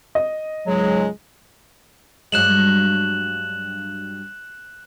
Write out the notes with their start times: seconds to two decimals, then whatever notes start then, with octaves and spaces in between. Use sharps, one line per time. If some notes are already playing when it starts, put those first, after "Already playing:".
0.15 D#5
0.67 C#2 G#2 F#3 G#3
2.32 G2 F#3 G#3 F#6 E7 F#7